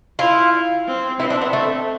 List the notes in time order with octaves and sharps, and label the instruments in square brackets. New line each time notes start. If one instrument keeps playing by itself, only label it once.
[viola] E4 [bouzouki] F4
[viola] C4
[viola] C4 [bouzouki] E4
[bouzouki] D4
B3
A3